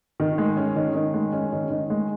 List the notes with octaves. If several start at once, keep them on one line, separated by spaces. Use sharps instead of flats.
D#3
G#3
C#4
D#3
D#3
G#3
C#4
D#3
D#3
G#3